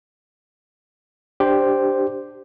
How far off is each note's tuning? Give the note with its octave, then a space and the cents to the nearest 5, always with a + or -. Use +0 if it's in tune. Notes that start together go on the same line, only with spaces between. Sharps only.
D4 +0 G4 +0 C5 +0